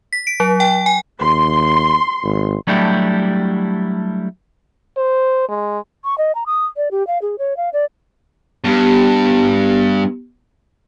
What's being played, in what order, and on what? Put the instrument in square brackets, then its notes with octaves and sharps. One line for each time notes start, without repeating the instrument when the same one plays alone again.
[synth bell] B6
D7
F#3
G5
G#5
[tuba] D#2 [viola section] C6
[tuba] G#1
[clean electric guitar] F#3 G3 A3 D4 E4 G4
[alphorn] C5
G#3
[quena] C#6
D#5
A#5
D#6
D5
G4
F5
G#4
C#5
F5
D5
[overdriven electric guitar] G2 [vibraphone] B3 G4